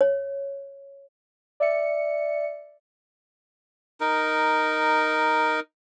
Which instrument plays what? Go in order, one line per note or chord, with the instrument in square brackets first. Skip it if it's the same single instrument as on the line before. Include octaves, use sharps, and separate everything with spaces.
[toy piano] C#5
[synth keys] D5 E5 C#7
[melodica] D#4 A#4